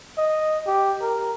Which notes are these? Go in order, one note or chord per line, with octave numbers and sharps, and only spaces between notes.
D#5
G4
A#4